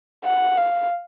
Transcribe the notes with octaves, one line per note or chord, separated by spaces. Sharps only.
F#5
F5